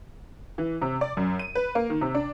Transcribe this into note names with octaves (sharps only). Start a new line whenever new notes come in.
E3
C3
D5
F#2
D#7
B4
A#3
D#3
C3
D4